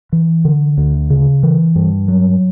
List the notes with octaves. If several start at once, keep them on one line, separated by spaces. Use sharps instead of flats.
E3
D3
D2
C#3
E3
G2
F#3